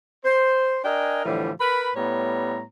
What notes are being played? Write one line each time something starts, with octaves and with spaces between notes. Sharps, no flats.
C5
D4 A#4 D#5 G5 G#5
A2 D3 E3 F3 G3
A#4 B4 B5
A2 G3 B3 C#5 A#5